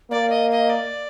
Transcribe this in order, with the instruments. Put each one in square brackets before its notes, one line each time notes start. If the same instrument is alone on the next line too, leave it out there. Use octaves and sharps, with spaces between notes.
[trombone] A#3 [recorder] D5
[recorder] D#5
D#5
D5